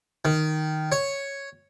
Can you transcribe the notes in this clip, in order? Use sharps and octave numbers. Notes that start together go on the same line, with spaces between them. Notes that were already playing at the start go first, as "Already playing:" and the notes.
D#3
C#5